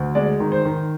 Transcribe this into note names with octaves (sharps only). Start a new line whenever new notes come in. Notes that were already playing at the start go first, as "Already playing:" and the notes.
Already playing: D2
G#3 D5
D#3
C5
D#3